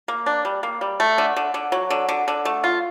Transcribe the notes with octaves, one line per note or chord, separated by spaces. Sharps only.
A#3
D4
G3
A#3
G3
A3
D3
D3
D3
F#3
D3
D3
D3
A3
F4